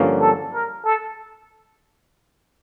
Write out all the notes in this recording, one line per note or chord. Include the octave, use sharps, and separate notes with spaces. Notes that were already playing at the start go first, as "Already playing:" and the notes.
Already playing: G2 D3 F3 A#3 C#4
A4
A#4
A4